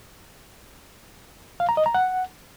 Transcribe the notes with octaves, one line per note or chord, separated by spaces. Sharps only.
F5
A#5
D#5
A#5
F#5